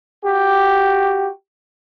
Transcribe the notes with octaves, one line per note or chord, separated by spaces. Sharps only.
F#4 G4